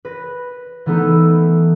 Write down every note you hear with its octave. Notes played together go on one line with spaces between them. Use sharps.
B4 A#6
E3 A3 B3 D#4 A4